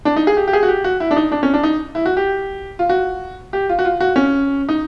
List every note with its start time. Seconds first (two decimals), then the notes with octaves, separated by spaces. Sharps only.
0.05 D4
0.16 D#4
0.27 G#4
0.37 G4
0.48 G4
0.53 G#4
0.63 F#4
0.68 G4
0.84 F#4
1.00 E4
1.11 D4
1.16 D#4
1.32 D4
1.43 C#4
1.54 D4
1.63 D#4
1.95 E4
2.06 F#4
2.17 G4
2.79 F4
2.89 F#4
3.53 G4
3.69 F4
3.79 F#4
3.85 F4
4.00 F#4
4.16 C#4
4.69 D#4